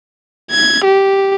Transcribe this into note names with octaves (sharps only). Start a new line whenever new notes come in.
G#6
G4